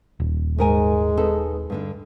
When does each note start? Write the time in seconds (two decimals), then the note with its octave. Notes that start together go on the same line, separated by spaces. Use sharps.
0.20 D#1
0.58 G#2 G#3 A#4 G#5
1.17 B3 D#4 A4
1.70 G2 D3 D4